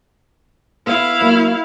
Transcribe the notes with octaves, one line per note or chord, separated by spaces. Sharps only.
B3 E4 F5
F#3 A#3